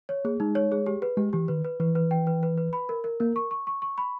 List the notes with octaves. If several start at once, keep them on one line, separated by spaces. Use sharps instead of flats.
C#5
A#3 G#4
G#3 D#4
C#5
G#4
G4
B4
G#3 G4
E3 G4
D#3 B4
B4
E3 B4
B4
G5
B4
B4
B4
B5
A#4
A#4
A#3 A#4
C#6
C#6
C#6
C#6
B5